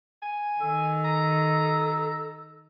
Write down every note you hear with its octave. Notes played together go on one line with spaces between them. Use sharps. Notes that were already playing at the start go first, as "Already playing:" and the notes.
G#5
D#3 A4
A#5